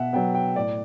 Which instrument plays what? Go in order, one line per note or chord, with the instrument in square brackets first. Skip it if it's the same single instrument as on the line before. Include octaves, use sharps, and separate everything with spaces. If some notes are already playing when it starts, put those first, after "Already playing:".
Already playing: [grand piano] B2 E5 F#5
F#3 B3 G5
G5
A2 D5